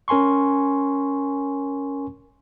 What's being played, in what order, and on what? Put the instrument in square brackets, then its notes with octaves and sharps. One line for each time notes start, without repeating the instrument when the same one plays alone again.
[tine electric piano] C#4 A#4 G#5 C6 C#6